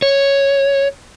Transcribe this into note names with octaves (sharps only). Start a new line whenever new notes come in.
C#5